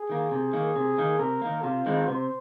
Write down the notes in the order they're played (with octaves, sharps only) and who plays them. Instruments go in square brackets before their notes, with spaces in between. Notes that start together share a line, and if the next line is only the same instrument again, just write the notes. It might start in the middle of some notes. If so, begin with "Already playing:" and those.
Already playing: [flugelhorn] G#4
[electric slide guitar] D#3 A#3
C3
D#3 A#3
C3
D#3 A#3
[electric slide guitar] C3 [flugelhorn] A#4
[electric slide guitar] D#3 A#3
[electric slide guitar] C3 [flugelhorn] F4
[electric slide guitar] D#3 G#3 C4 D#4
[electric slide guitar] C3 [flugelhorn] C5